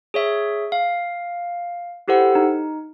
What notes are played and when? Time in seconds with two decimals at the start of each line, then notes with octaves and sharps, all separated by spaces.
0.14 G#4 C#5 E5
0.72 F5
2.08 E4 G4 A4 C5 F#5
2.35 D#4